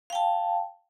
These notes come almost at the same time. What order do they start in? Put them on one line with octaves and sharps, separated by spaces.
F5 G5 A5